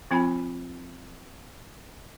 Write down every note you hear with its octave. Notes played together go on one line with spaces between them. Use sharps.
F3 C4 F4 G#5 B5